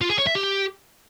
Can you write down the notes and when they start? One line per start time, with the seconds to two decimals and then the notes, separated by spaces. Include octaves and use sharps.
0.01 F4
0.10 G#4
0.18 C#5
0.27 E5
0.35 G4